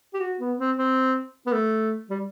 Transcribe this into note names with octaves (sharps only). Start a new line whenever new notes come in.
G4
F#4
B3
C4
C4
B3
A3
G3